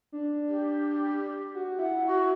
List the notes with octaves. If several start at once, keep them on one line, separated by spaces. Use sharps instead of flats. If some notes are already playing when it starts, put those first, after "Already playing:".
D4
G4
F#4
E4 F#5
F#4